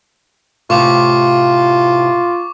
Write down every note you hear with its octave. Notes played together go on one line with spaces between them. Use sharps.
A2 C3 F4 F5 C#6 D6